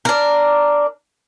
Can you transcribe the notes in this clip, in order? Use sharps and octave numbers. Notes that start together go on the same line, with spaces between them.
D4 A#4